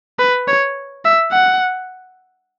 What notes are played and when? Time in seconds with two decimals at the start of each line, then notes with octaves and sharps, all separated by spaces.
0.19 B4
0.48 C#5
1.05 E5
1.32 F#5